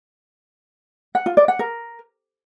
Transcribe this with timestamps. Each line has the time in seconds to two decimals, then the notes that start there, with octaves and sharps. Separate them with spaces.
1.15 F#5
1.26 F4
1.37 D5
1.48 F#5
1.59 A#4